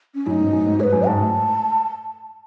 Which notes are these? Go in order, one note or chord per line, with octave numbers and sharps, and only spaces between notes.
C#4
F#2 A2 D#4 E4
G#2 B2
F#2 A2
G#2
G#2 B4 C#5
F#2
G#2 A5
A2